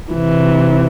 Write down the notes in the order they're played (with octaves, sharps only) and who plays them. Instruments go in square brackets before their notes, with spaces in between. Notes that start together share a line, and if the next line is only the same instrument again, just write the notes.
[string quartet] C3 E3